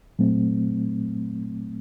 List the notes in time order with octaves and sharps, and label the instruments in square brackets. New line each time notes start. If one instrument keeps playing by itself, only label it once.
[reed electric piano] A#2 F#3 A3 C4